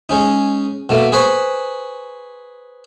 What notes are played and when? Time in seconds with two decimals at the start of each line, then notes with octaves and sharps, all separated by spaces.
0.09 G#3 C#4 D#4
0.89 B2 A3 A#3
1.12 G#4 B4 C5 C#6